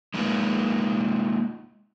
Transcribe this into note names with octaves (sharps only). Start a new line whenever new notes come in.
G#3 A#3 D#4 F4 B4